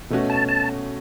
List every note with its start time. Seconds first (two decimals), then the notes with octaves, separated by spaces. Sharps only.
0.10 B2 A3 C#4 F#4
0.30 A5
0.49 A5